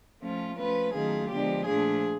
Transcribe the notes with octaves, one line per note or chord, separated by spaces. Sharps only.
F3 A3 C#4 F4
F3 A3 C#4 F4 B4
D#3 F#3 A3 C#4 F4 G#4
D3 F3 G#3 B3 D4 G4
A#2 F3 A3 D4 F4 G#4